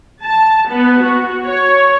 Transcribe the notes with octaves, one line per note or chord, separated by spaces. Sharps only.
A5
B3
F#4
C#5